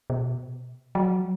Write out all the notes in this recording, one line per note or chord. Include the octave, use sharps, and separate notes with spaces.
B2
F#3